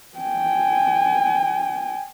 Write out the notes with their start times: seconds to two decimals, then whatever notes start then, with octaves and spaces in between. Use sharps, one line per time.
0.19 G5 G#5